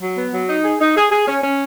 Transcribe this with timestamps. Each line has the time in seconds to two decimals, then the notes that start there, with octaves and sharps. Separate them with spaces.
0.01 F#3
0.17 B3
0.33 F#3
0.49 D#4
0.64 G#4
0.80 D#4
0.97 G#4
1.11 G#4
1.28 C#4
1.44 C#4